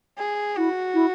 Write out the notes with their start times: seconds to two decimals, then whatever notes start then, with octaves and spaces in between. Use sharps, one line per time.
0.18 G#4
0.57 E4 F#4
0.94 E4